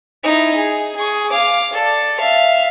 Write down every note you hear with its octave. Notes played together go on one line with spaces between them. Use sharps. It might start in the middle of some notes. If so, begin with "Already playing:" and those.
D#4 E4
G#4
G#4 C#6
F5 D6
A4 D5
E5 F5